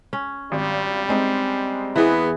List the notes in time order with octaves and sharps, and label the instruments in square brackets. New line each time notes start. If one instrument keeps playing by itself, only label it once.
[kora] C#4
[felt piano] G#1 [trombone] G3
[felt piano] G#3 C4 D#4
[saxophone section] E2 B3 [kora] E3 G#4